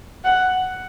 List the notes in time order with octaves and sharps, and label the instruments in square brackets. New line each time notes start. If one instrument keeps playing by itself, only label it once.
[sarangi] F#5